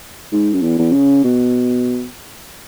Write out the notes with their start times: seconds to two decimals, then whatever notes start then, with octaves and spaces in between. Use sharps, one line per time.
0.32 G#2
0.53 F#2
0.63 E2
0.79 E2
0.93 C#3
1.24 B2